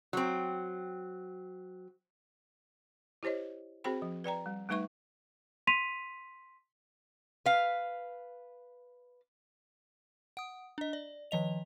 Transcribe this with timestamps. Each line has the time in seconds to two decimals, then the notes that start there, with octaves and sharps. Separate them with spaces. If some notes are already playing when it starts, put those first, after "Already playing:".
0.13 F#3 C4
3.23 E4 G4 C5 C#5 D#5
3.84 C4 F#4 G#4 C5 G5 B5
4.02 F3
4.24 B4 D5 G5 A#5
4.46 G3
4.69 G3 A3 D#4 B4 E5 C#6
5.67 C6 B6 D#7 F7
7.46 B4 F5
10.37 F#5 D#6
10.78 D4 D#5
10.93 D5
11.31 D#3 F3 D#5 F7